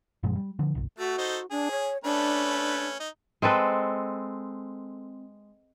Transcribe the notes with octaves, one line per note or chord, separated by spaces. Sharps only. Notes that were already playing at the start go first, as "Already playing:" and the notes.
F#2 A#2 F3 G#3
G3
D3 F3
G1 C2
A3 F#4
D#4 A4 C5
D4 G#4
C#5
A3 C#4 D4 B4
D#4
G#3 C4 A4 B4